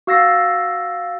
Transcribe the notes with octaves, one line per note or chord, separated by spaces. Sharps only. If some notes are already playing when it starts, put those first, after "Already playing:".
F#4 F5 E6 A6 A#6 C7